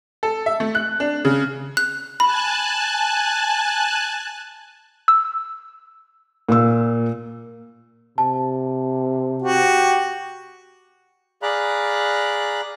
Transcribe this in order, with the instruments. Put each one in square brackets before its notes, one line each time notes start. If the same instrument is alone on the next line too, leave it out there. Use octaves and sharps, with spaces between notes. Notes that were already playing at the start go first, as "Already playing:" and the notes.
[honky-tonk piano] A4
E5
A3
F#6
D4
C#3
[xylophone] F#6
[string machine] G#5 A5 F#6 [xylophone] B5
[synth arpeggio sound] E6
[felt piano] A#2 F4 E6
[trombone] C3 [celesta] A5
[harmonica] F#4 G4
[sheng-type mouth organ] G#4 D5 F5 A#5 B5 F#6